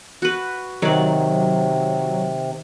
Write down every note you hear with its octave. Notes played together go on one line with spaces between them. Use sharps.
F#4 B4
C3 D#3 F#3 D5